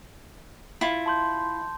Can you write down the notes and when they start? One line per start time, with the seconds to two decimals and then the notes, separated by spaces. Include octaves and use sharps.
0.81 E4 F4
1.06 A5 C6 G6